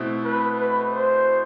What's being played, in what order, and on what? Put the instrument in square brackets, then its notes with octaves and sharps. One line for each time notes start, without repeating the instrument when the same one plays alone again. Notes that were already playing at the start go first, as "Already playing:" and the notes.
Already playing: [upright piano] B2 A3 C4 E4
[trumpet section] B4
B4
C5